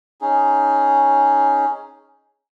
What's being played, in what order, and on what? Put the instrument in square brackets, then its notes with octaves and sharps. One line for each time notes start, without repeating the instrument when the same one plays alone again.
[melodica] C#4 D#4 G#4